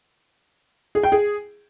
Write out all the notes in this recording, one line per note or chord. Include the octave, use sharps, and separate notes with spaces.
G#4
G5
G#4